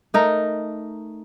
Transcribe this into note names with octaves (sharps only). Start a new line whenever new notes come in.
A3 D#4 A#4